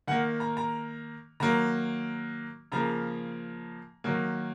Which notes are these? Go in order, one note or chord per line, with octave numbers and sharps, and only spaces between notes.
D#3 A#3 F#5
A#5
A#5
D#3 F#3 A#3 A#5
C#3 F3 A#3 A#5
D#3 F#3 A#3